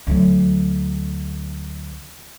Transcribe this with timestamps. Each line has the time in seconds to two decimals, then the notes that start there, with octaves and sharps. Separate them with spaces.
0.07 D2 F#3